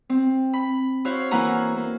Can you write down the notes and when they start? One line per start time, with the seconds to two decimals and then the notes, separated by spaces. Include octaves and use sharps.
0.10 C4
0.53 B5
1.05 E4 F#4 C5 C#5 F5
1.31 E3 A#3 E4 F#5 G#5 A#5
1.77 A#3